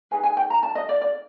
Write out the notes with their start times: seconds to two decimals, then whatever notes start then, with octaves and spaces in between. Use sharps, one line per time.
0.11 D#4 G#4 B4 G#5
0.23 G#5
0.37 G5
0.50 A#5
0.63 A5
0.75 D#5
0.89 D5
1.01 D5